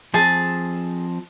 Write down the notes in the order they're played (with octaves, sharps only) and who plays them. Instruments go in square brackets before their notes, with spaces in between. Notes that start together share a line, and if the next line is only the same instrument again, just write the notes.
[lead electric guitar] F3 C4 [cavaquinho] G#4 A5